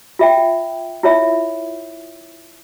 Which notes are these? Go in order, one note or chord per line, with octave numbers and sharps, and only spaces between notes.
F4 E5 G5
E4 F4 C#5 E5